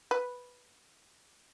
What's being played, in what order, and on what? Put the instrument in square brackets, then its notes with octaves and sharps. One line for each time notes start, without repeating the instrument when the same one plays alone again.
[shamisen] B4